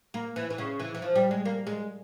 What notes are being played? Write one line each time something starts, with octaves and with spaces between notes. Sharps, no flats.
A#3
E3
E3
C#3
E3
E3
F3
G3
G#3
A#3
G#3